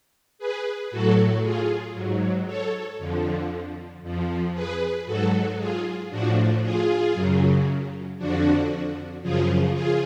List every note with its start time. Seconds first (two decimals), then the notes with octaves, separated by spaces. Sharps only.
0.38 G#4 B4
0.91 A2 F#3 F#4 A4
1.43 F4 G#4
1.95 G#2 F#3
2.46 A4 C#5
2.99 F2 D3 F3
4.03 F2 F3
4.54 G#4 B4
5.06 G#2 F#3 F#4 A4
5.58 F4 G#4
6.10 A2 F3 D4 F#4
6.62 F4 G#4
7.14 F#2 C#3 F#3
8.18 F2 D3 F3 D4 F#4
9.22 F#2 C#3 F3 F4 G#4
9.74 F4 G#4